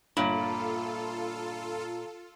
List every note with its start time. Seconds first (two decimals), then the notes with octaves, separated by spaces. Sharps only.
0.17 G1 A#2 F4 A4 C#5 B5